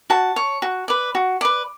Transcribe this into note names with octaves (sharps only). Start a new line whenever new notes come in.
F#4 A5
C#5
F#4
B4 D5
F#4
B4 D5